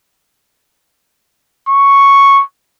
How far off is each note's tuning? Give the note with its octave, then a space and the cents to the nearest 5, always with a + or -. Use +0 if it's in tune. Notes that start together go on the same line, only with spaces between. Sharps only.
C#6 +0